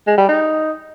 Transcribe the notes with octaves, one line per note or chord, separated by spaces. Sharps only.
G#3
G3
D#4